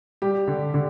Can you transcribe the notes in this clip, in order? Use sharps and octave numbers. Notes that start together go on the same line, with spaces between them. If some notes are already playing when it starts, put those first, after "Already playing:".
G3 G4
D3
D3